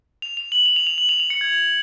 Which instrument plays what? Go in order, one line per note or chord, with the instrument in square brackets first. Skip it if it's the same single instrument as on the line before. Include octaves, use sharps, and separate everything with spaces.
[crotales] F7
F7
F#7
F7
F7
F7
F#7
F7
F7
C#7
G#6